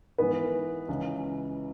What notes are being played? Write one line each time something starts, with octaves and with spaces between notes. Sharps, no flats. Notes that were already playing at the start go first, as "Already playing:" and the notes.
G#2 E3 B3 B4
C#2 C#3 E3